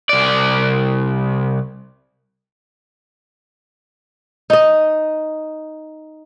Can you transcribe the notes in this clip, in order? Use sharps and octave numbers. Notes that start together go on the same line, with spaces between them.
C2 D5
D#4 D#5